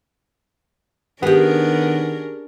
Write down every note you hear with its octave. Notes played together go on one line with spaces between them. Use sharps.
D#3 B3 C#4 D4 G4 G#4 A#4